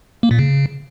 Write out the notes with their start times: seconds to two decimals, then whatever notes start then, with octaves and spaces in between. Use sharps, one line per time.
0.23 A#3
0.31 A#2
0.39 C#3